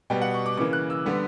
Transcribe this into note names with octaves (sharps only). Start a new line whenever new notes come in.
B2 G3 B3 G5
F#5
C#6
D6
C#3 E3 A#3 D6
F#6
E6
D3 G3 B3